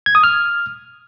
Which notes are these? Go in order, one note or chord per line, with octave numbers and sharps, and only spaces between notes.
G#6
D#6
F6